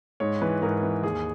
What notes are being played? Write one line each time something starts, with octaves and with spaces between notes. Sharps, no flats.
G#2 C#5
E3 B4
G#2 A#4
E3
D#2 G#4